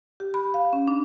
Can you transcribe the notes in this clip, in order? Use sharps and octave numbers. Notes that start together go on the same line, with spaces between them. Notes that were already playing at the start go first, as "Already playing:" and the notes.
G4
B5
F5
C#4
D4